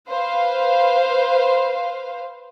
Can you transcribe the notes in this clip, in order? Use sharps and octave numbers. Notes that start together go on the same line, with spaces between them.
B4 C5 F5